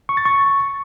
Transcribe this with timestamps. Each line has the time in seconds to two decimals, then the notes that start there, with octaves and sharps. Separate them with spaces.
0.09 C#6
0.17 A6
0.25 C#6